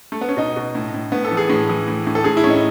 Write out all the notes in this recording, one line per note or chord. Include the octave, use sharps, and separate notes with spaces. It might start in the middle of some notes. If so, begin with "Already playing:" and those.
A3
B3
C#4
B2 D#4
B2
A2
A2
A2 B3
A4
E3
G#4
A2
E3
A2
A2
A4
A2 G#4
E4
A2 C#4
D#4